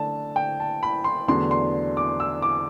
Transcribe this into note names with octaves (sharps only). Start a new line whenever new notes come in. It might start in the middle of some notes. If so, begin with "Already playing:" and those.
Already playing: D3 A3 A5
G5
A5
B5
C6
E2 D3 F#3 A3 C6
C6
D6
E6
D6